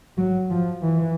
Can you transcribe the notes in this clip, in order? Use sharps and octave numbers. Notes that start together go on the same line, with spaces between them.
F#3
F3
E3